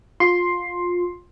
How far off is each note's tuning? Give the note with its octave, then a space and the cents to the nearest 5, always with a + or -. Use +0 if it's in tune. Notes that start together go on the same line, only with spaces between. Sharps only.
F4 +20 C6 +5